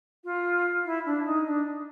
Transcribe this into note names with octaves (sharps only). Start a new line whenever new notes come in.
F4
E4
D4
D#4
D4